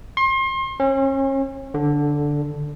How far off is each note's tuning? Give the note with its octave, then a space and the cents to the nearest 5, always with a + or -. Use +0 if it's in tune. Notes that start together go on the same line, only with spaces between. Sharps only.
C6 +35
C#4 -35
D3 -5